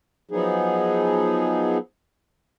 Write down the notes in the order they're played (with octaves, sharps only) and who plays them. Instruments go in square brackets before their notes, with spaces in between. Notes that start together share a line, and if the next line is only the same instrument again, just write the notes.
[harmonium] F3 F#3 B3 D#4 G#4